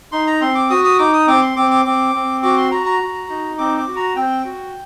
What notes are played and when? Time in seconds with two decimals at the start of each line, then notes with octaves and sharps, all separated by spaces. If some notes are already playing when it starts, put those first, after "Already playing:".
0.12 D#4 C6
0.27 A#5
0.41 C4 C6
0.55 D6
0.70 F#4 D#6
0.84 D#6
0.98 D#4 D6
1.13 D#6
1.27 C4 D6
1.42 C6
1.56 C4 D6
1.71 D6
1.85 C4 D6
2.14 C4
2.42 F#4 D6
2.57 C6
2.71 F#4 A#5
2.86 A#5
3.00 F#4
3.29 D#4
3.58 C4 D6
3.77 D6
3.87 F#4
3.96 A#5
4.16 C4 G5
4.45 F#4